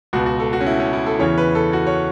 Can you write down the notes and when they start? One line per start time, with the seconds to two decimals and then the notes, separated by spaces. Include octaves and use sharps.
0.13 C#2 B2 F#4
0.26 F#4
0.40 A4
0.53 F#4
0.61 C#4
0.66 E4
0.80 C#4
0.93 E4
1.06 A4
1.19 E2 C#3 E3 C#5
1.38 B4
1.55 A4
1.73 F#4
1.87 C#5